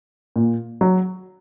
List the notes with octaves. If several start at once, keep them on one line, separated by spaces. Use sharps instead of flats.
A#2
F#3